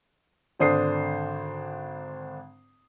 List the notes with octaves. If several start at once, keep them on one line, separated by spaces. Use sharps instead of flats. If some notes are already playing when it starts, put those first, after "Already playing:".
G#1 D3 D4 C5 D#6 C7